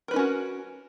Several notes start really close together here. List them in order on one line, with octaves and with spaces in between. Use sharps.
A#4 B4 D#4 C#4 F#4